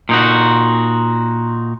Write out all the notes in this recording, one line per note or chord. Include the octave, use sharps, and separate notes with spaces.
A#2 D#4 F#4